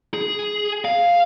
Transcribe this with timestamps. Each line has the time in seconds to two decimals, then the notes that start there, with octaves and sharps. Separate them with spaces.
0.14 G#4
0.85 F5